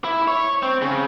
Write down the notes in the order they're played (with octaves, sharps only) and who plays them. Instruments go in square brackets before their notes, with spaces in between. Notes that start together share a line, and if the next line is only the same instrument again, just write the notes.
[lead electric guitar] E4
C#5
C4
C#3